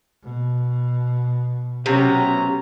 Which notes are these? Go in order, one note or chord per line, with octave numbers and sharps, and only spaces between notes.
B2
C3 F#3 A3 B3 C#4 A#5